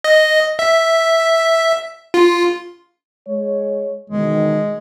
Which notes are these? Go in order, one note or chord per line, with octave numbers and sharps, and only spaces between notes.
D#5
E5
F4
G#3 C#5
E2 B2 D#3 G#3